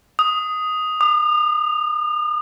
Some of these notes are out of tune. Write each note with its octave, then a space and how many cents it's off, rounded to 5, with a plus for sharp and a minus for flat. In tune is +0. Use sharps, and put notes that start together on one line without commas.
D#6 +5
D#6 -45